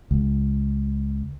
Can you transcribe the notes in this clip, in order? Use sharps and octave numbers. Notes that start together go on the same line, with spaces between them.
C#2